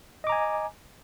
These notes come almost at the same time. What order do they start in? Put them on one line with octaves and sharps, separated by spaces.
D#5 D6 A#5 G#5